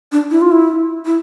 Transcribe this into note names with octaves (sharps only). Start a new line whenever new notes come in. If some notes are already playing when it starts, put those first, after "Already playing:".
D4
E4
F4
E4
E4